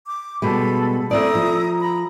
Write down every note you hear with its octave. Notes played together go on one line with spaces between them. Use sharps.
D6
B2 G3 G#3 A4 B5
A3 C4 E4 D5 A#5 D#6
F3
A#5 B5